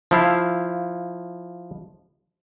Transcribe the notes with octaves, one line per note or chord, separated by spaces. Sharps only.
F3 E4 F5